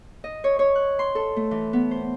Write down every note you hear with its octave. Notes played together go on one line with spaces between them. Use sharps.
D#5
C#5
C#5
F#6
C6
A4
A3
E3
B3
C5